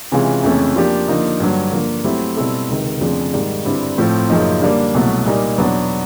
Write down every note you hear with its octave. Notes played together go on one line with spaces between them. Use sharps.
C3 E3 G#3 C#4 F4
F2 C#3 E3 A3 C#4
F3 A#3 D4 G4
D3 F3 A#3 D#4
G2 D3 F#3
D3 F3 A#3
F#3 A3 C4 E4 G4
B2 G3 C4 E4 A4
C#2 C3 D#3
F2 C#3 F3 A3 D4
G#2 D#3 G3
G2 D3 G3 C4 E4
A2 F3 A3 C4
F#2 C#3 F3 A#3 D#4
D3 G3 A#3 D4
C2 B2 F#3 A3
A#2 G3 A#3 D#4
E2 B2 F#3 B3 D4